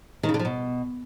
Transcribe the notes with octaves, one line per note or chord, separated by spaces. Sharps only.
D#3
C#3
D3
F3
B2